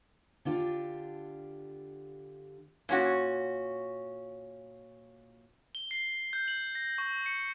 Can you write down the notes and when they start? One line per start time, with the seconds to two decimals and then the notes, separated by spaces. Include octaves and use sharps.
0.45 D3 D4 F4 G4
2.89 A#2 C#4 F#4
5.75 G7
5.91 C7
6.33 G6
6.48 F#7
6.75 A#6
6.98 C#6
7.26 C#7